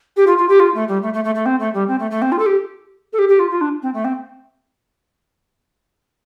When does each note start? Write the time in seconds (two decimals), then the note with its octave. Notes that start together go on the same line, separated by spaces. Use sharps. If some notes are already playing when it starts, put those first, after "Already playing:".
0.16 G4
0.27 F4
0.37 F4
0.48 G4
0.59 F4
0.74 A3
0.88 G3
1.02 A3
1.13 A3
1.24 A3
1.35 A3
1.45 C4
1.59 A3
1.74 G3
1.88 C4
1.99 A3
2.11 A3
2.21 C4
2.32 F4
2.38 A4
2.46 G4
3.13 A4
3.18 G4
3.28 G4
3.39 F4
3.50 F4
3.61 D4
3.82 C4
3.93 A3
4.04 C4